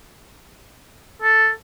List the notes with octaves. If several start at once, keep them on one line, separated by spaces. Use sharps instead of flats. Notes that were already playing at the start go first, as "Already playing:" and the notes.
A4